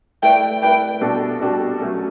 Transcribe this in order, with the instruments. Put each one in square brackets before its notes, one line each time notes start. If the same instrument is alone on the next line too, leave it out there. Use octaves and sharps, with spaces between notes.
[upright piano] A3 E4 B4 D5 [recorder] G5
[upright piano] A3 E4 B4 D5 [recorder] G5
[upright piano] B2 G3 D4 F#4 A4
B2 G3 D4 F#4 A4
F#3 A3 C#4